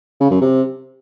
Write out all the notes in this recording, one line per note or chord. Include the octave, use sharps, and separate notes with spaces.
C#3
F#2
C3